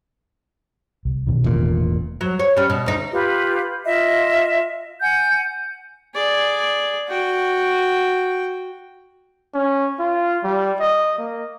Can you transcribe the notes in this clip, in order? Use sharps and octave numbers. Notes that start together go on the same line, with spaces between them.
C2
B2 D#3
E1 A1 A#2
F#3
C#5
G3 C#4
B2
D2 D#4
F4 G4 B4
F4 D#5 E5
F#5 G#5 G6
G#4 D5
F#4 G5
C#4
F4
G3
D#5
A#3